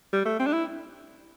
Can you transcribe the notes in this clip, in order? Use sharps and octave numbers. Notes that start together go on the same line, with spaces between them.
G3
A3
C4
D4
E4